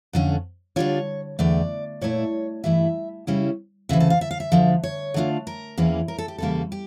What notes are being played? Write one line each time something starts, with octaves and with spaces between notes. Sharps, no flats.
F2 D3 A3 C#4
D3 G3 D4 F4 C#5
E2 D3 A3 D5
A#2 A3 E4 C#5
G2 E3 A3 E4 E5
C#3 G3 C#4 E4
D2 C#3 E3 E5
A4
F5
E5
F5
E5
D2 D3 F3
C#5
D3 A3 D4 F4
A#4
E2 E3 A#3 C#4 E4
A#4
A4
G4
E2 C#3 G3 A#3 A4
G4